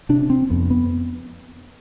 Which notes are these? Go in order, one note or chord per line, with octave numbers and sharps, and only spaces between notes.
C3 D4
C4
F2 B3
B3